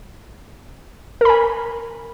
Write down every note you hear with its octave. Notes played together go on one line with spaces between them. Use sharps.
A#4 G#5 B5